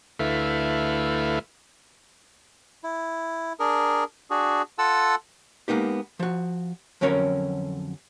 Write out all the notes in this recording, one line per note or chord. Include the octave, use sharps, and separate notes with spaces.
D2 A3 E4 B4 F5
E4
D4 G#4 A#4
D4 F#4 G#4
F4 A4 F#5 A5 E6
G#3 A#3 B3 D#4 G4
F3 F#4
F2 D3 F#3 C#4 A#4 C#5